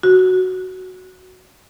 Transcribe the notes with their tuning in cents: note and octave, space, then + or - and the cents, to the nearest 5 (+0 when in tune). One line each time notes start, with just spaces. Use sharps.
F#4 +5